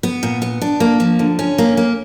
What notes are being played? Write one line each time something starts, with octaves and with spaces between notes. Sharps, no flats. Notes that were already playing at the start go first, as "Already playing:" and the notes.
B3
A#2
B3
D4
A#3
F3
D3
C#4
A#3
A#3